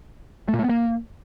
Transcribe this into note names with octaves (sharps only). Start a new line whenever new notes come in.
A3
A#2
A3
B3
A#3